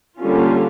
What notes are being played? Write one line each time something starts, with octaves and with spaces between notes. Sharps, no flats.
D3 G3 A#3 C#4 F4